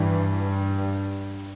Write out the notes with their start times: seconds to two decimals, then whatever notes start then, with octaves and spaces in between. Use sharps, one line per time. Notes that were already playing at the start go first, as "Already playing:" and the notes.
Already playing: G2 E3